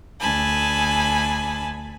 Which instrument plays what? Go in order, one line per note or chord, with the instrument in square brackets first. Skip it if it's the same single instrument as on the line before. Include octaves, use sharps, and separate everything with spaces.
[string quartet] D2 G#5 A5 B5